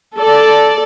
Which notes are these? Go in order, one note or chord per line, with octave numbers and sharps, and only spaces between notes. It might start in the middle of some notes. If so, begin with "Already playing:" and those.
A4 D5